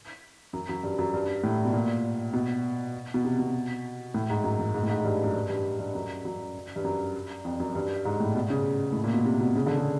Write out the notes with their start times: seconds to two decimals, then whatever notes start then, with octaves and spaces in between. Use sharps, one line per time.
0.53 F#2
0.69 F#2
0.83 G2
0.99 F#2
1.14 G2
1.44 A2
1.65 B2
1.73 A#2
2.33 B2
3.14 B2
3.24 C3
3.39 B2
4.14 A2
4.30 G#2
4.44 F#2
4.59 F#2
4.74 G#2
4.83 A2
4.89 G#2
5.04 G2
5.23 F#2
5.34 G2
5.49 G2
5.80 G2
5.95 F#2
6.25 F#2
6.76 G2
6.85 F#2
7.45 F2
7.60 F#2
7.75 G2
8.05 G#2
8.20 A2
8.35 B2
8.50 C#3
8.93 A2
9.04 A#2
9.14 B2
9.25 C3
9.40 B2
9.56 C#3
9.66 D3
9.77 C#3